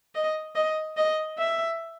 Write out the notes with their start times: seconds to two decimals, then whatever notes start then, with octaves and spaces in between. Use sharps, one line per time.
0.15 D#5
0.55 D#5
0.97 D#5
1.38 E5